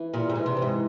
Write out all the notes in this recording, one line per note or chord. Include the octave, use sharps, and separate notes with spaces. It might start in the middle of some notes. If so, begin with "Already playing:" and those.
Already playing: E3
A#2 G3
G#2
E3
C3
E3
G#2